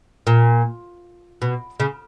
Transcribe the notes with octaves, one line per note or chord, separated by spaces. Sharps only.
A#2
B2
C#3